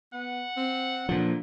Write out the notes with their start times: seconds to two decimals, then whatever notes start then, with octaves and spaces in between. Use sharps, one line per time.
0.14 B3 F#5
0.57 C4
1.09 A#2 D3 F3